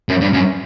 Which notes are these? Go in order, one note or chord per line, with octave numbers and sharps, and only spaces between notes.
F#2
G2
F#2